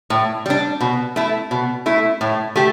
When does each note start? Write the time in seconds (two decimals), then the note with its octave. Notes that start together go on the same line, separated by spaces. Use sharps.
0.10 A2
0.46 G3 D4
0.81 B2
1.16 A3 E4
1.51 B2
1.86 A3 E4
2.21 A2
2.56 A3 G4